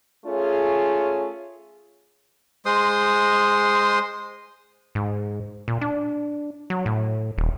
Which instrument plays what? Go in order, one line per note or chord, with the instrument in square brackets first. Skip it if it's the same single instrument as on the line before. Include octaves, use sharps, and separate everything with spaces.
[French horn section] A3 C#4 F4 G#4
[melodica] G#3 C5 C6 D#6
[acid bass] G#2
A#2
D4
F#3
A2
D#1